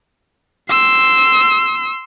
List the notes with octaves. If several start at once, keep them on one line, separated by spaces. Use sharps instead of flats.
C6 E6